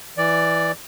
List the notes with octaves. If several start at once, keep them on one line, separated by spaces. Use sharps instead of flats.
E3 D5